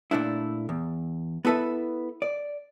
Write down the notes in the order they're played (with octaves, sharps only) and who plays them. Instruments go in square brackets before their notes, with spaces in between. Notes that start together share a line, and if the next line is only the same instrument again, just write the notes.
[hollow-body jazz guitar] A#2 A3 D4 E4
E2
B3 E4 A4 B4 E5
D5